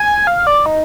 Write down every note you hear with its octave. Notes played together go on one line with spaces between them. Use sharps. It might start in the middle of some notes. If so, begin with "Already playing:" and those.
Already playing: G#5
F5
D5
D#4